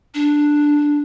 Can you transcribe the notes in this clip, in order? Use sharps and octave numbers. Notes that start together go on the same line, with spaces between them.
D4